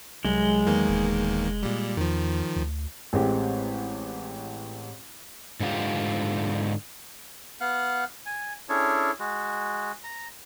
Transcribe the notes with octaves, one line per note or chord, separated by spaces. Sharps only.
C2 F#3 G#3
E2 D#3 A#3
F1
A#2 G3
E2 D#3 F3
D2
A1 G#3 C4 G4
G#2 D3 E4 F4 G4
B3 F5 F#5 F#6
G#5
C#4 D4 E4 G#4 A4 C#5
G#3 F#4
A#5